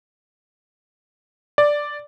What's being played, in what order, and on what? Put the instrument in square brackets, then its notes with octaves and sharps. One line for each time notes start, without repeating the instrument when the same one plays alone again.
[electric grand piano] D5